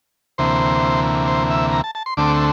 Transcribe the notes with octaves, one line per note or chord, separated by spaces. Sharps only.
D2 C3 E3 A#3 C5
C5
E5
A#5
A5
A5
C6
D2 D3 A3 C4 D6